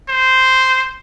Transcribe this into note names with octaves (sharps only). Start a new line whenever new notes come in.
C5